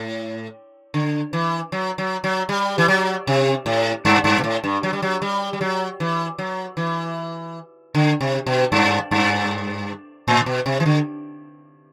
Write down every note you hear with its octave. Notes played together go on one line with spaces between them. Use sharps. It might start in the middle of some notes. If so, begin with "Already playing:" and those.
Already playing: A2
D3
E3
F#3
F#3
F#3
G3
E3
F#3
C3
A2
G2
G2
B2
A2
G2
F#3
G3
F#3
G3
G3
F#3
E3
F#3
E3
D3
C3
B2
G2
G2
A2
B2
C3
E3
D3